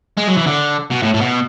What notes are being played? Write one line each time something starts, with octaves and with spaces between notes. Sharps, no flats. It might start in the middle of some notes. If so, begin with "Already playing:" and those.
G#3
F#3
E3
D3
B2
A2
A2
B2